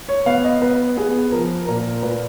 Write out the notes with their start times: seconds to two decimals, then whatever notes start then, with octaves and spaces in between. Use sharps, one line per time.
0.09 C#5
0.26 B3 F5
0.44 D#5
0.62 B3 B4
0.97 B3 G#4
1.32 F3 A#4
1.67 A#2 A#4
2.03 A#2 B4